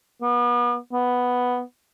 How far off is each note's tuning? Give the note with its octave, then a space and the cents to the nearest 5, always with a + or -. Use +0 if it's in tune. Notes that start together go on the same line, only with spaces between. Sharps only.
B3 -35
B3 +0